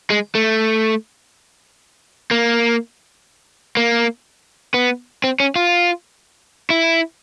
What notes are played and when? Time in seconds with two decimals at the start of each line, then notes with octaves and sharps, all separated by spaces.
0.10 G#3
0.35 A3
2.31 A#3
3.77 A#3
4.74 B3
5.24 C4
5.40 C#4
5.56 F4
6.70 E4